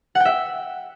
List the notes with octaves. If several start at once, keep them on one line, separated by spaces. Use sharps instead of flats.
F#5
G5
E5